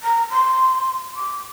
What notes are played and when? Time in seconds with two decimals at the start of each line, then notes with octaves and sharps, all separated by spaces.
0.03 A#5
0.31 C6
1.16 D6